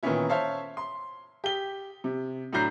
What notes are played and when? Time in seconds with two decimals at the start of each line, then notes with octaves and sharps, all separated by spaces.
0.03 A#2 D#3 E3 B3 C#4 E4
0.29 C5 C#5 E5 F5 A5
0.77 C6
1.44 G4 G7
2.04 C3
2.53 A2 F#3 D4 A#5 G6 C7